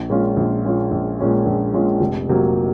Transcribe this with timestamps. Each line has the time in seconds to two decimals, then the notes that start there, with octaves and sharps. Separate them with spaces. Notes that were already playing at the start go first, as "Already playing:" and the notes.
Already playing: A#1
0.10 A#2 G#3 C#4 F4
0.37 A#1
0.64 A#2 G#3 C#4 F4
0.91 A#1
1.19 A#2 G#3 C#4 F4
1.46 A#1
1.73 A#2 G#3 C#4 F4
2.00 F1
2.28 F2 C3 F#3 A#3